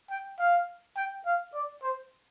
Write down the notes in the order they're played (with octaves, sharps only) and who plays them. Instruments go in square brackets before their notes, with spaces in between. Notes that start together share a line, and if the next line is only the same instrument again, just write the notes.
[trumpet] G5
F5
G5
F5
D5
C5